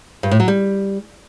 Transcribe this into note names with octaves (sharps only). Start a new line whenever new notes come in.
G2
A2
F#3
G3